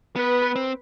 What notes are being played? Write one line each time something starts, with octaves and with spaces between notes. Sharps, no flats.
B3 B4
C4